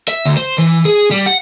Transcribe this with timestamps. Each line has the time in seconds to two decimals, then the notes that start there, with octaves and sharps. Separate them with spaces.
0.08 E5
0.26 D2
0.37 C5
0.58 E3
0.85 G#4
1.11 G3
1.26 F#5